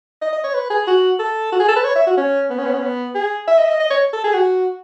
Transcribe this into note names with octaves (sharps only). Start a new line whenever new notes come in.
D#5
D#5
C#5
B4
G#4
F#4
A4
F#4
G#4
A4
B4
C#5
E5
F#4
C#4
B3
C#4
B3
C#4
B3
G#4
E5
D#5
E5
D#5
D#5
C#5
A4
G#4
F#4